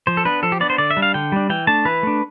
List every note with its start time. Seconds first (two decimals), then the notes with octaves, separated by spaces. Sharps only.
0.07 F3 C5
0.17 A4
0.25 B3 D4 B4
0.43 F3 A4
0.52 G4
0.60 B3 D4 D5
0.70 C5
0.78 D3 D5
0.91 E5
0.96 G3 D4
1.02 F5
1.14 D3 G5
1.32 G3 D4
1.50 E3 G5
1.67 A3 D4 A5
1.85 E3 B4
2.03 A3 D4